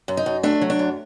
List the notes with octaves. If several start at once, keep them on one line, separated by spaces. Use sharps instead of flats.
F#2
D#4
F#2
A3 D4
F#3
D4
F#2